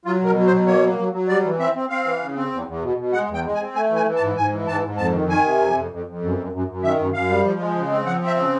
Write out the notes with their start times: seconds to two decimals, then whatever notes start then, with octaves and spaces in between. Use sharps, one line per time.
0.05 F#3 F4
0.21 B2 A#4
0.36 F#3
0.46 C5
0.52 B2
0.66 A#3 C#5
0.82 F#3
0.98 F#3
1.13 F#3
1.28 G3 D5
1.44 E3
1.59 C4 E5
1.75 C4
1.90 C4 F5
2.05 E3
2.22 C#3
2.36 C4
2.52 E2
2.67 E2
2.83 B2
2.97 B2
3.13 G#3 F#5
3.29 E2 G5
3.45 G#3
3.55 G#5
3.60 C4
3.75 A3 G#5
3.90 E3
3.96 G#5
4.06 E3
4.16 A5
4.21 G#2
4.36 G#2 G#5
4.52 E3
4.67 G#2 A5
4.83 G#2
4.98 F2 A5
5.13 D#3
5.29 D#3 G#5
5.44 C3
5.60 F2
5.75 F2
5.91 F2
6.06 F2
6.22 F#2
6.37 F#2
6.52 F#2
6.67 F#2
6.83 D#3 E5
6.98 F#2
7.13 F#2 F5
7.29 G3
7.44 F3
7.60 G#3
7.75 C#3
7.91 C4
8.06 F3 F#5
8.21 C4
8.27 E5
8.36 C#3